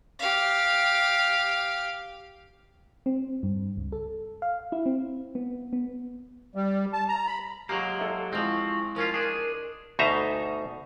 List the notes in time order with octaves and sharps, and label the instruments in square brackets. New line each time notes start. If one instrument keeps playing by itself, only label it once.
[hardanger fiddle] G4 F5
[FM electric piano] C4
G2
C#2
A4
F5
E4
C4
B3
B3
[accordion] G3
A5
A#5
B5
[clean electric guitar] F#3 G#3 A#3 [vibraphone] G4 [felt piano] A#5
[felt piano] A4 E5
[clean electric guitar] F3 C4 [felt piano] G#3 [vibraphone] E4 C#6
[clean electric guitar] F3 C#4 F4 [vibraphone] A#4
[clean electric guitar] D4 G#4
[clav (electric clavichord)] D2 B2 D#4 C5 E5 A#5